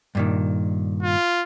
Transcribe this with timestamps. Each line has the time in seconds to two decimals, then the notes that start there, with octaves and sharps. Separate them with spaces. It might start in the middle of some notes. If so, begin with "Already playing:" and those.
0.15 G2 A#2 D#3
1.03 F4